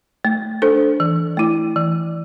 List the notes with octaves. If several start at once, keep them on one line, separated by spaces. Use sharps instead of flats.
A3
D4 A4 C5
E3
A3 E4
E3